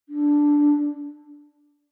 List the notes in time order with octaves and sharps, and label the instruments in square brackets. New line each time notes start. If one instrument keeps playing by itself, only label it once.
[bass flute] D4